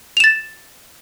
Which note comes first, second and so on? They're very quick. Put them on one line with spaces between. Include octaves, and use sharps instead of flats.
F7 E7 A6